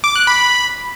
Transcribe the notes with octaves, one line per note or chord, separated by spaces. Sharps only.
D6
F#6
B5